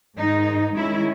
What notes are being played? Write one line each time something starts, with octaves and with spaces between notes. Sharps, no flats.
G#2 D#3 G#3 D#4
D#3 G#3 C#4 E4